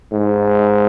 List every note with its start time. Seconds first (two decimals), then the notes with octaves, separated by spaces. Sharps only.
0.12 G#2